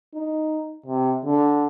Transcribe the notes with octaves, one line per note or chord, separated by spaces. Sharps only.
D#4
C3
D3